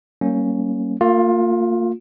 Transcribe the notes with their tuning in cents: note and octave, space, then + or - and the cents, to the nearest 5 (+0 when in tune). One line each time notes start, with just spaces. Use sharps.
G3 -40 A#3 +0 C#4 +0
A#3 -35 F4 +20